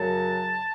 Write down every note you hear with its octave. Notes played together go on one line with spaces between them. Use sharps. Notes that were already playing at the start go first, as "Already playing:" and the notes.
Already playing: F#2 C#3 F#3 A5